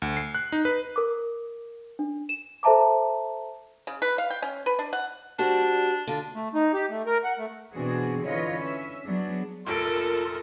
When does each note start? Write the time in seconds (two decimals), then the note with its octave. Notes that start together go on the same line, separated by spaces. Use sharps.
0.02 D2
0.17 C7
0.35 F#6
0.52 D#4
0.65 B4
0.96 A#4 D6
1.99 D4
2.29 E7
2.63 A4 C5 E5 A5 A#5 D6
3.87 C#3
4.02 B4
4.18 F5
4.30 G5
4.42 C#4
4.66 B4
4.79 D4
4.93 F#5
5.39 G3 D4 F#4 C5
6.07 D3 F4
6.35 A3
6.54 D#4
6.74 G4
6.90 A3
7.06 A#4
7.24 F#5
7.38 A3
7.74 B2 E3 C4 D4 F#4 G#4
8.24 D3 E3 F4 B4 C#5 D#5
8.60 C#4 E5
9.06 F#3 B3 D4 G#4
9.66 F1 A#1 F4 A4 A#4 D7